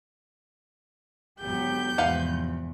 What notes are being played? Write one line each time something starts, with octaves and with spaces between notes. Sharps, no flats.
G#1 D3 F#3 B3 G4 G6
E2 G#2 C3 F3 B4 F5 F#5